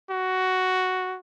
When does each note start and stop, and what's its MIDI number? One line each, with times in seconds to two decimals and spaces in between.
0.10 1.17 66